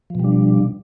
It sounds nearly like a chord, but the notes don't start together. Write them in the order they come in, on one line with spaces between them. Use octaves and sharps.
F3 B2 G3 D4